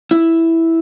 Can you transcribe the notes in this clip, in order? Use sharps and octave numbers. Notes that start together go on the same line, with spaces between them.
E4